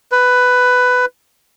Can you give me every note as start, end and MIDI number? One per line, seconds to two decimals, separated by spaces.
0.12 1.05 71